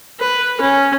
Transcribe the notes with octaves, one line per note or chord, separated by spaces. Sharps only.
B4
C#4